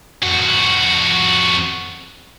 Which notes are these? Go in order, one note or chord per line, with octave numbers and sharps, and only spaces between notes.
F2 F#4